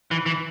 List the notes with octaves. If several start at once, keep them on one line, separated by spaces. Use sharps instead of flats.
E3
E3